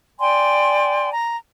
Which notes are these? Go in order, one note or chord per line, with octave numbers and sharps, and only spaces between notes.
D5 G5 G#5 C6
A#5